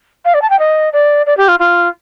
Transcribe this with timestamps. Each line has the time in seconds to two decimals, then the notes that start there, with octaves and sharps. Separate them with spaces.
0.25 F5
0.34 D5
0.42 A5
0.50 G5
0.59 D#5
0.93 D5
1.26 D5
1.37 G4
1.48 F4
1.59 F4